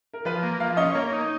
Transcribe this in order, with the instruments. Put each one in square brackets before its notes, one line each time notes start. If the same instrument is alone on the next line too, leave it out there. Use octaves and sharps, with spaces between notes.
[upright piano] A#4
[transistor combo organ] F3 [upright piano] B4
[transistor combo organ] A#3
[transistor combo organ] F3 [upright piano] F5
[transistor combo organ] C#4 [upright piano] D#5
[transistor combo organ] A#3 [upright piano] C#5
[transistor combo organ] D#4